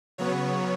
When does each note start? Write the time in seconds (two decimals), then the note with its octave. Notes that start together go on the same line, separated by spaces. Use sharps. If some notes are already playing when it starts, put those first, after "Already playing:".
0.18 C#3 F#3 B3 C#5